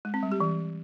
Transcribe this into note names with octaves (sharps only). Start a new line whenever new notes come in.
G#3
C4
G3
G4
E3